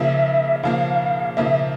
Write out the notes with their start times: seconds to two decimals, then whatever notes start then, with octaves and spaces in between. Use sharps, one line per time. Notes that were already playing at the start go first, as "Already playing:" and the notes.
Already playing: C#3 F3 A#3 E5
0.63 C#3 F3 A#3 F5
1.37 C#3 F3 A#3 E5